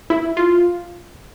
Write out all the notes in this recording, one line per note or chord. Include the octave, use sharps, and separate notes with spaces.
E4
F4